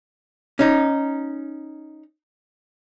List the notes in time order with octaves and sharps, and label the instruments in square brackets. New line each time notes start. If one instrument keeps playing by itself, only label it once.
[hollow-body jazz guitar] C#4 D#4